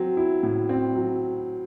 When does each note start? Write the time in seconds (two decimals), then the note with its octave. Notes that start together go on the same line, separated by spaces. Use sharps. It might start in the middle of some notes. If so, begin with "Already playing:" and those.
Already playing: F#3 C4
0.17 E4
0.43 A2
0.69 C4
0.96 F#3